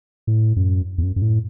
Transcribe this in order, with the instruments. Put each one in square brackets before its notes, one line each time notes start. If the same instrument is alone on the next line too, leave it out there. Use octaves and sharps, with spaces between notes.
[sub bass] A2
F#2
E2
F#2
F#2
A2